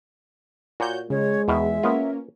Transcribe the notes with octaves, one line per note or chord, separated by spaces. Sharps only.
A#2 F#4 C#5 G6
C#3 G#3 C#5
E2 B2 D#3 E5
A#3 B3 C#4 F4 A#4